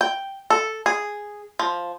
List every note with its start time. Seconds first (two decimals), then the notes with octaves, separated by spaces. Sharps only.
0.01 G5
0.50 A4
0.86 G#4
1.59 F3